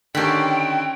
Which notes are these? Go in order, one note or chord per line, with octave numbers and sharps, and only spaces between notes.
D3 D#3 C#4 G4 G5 B5